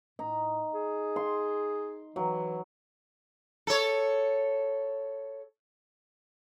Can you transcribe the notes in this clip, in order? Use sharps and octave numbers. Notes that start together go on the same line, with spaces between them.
A2 D#4
G#4
C6
E3 F#3
A4 C#5